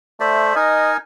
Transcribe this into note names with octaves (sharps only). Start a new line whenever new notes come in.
A3 C5 D5 E5
D#4 A#4 D#5 G#5